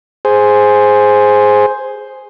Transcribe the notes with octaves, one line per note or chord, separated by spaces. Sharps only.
G#4 C5